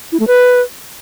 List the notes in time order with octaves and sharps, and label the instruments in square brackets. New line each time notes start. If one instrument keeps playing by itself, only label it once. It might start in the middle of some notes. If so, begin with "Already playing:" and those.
[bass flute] E4
A3
B4